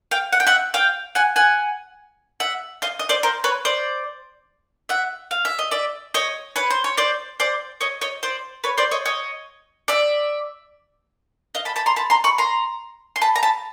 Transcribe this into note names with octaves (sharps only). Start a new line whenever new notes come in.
F5 G5
F#5
G5
E5 F#5
F5 G5
F#5 G#5
F#5 G#5
E5 F#5
D#5 F5
D#5
C5 D5
A#4 C5
B4 C#5
C5 D5
E5 F#5
F5
E5
D#5
D5 E5
C#5 D#5
B4 C#5
C5
C#5
C5 D5
C5 D5
C#5 D#5
C#5 D#5
C5 D5
B4 C#5
C5 D5
C#5 D#5
C#5 D#5
D5 E5
D#5 F5
A5 B5
A5 B5
A#5 C6
A5 B5
A#5 C6
B5 C#6
A#5 C6
C6
A5 B5
A#5
A5 B5